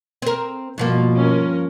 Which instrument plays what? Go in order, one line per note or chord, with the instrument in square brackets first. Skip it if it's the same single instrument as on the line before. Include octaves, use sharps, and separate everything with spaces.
[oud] C4 A#4
[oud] G2 F3 A#3 [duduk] B2
[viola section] C#4 A#4